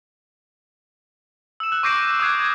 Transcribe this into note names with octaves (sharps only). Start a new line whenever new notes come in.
E6 E7
E6 F#6
C#6 D6 G6 A#6 C7 D7
G6
D6 D#6 F#6 G#6 C7
G#6